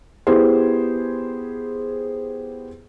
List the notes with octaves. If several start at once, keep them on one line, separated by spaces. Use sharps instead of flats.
B3 E4 G4 G#4 C5